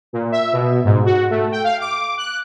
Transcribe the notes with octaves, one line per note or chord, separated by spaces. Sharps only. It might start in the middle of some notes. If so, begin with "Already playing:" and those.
A#2
E5
B2
G#2
F#4
A3
G5
F5
D6
F#6